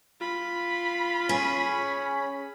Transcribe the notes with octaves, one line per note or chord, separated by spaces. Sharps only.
F4 B5
C#4 G#4